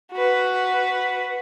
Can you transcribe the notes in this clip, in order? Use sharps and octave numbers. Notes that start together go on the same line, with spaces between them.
F#4 B4